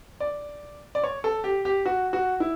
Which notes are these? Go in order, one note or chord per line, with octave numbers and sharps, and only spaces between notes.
D5
D5
C#5
A4
G4
G4
F#4
F#4
E4